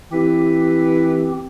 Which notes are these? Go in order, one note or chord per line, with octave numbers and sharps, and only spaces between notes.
E3 C4 G4